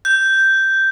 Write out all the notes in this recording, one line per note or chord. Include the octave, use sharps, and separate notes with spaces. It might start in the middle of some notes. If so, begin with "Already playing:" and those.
G6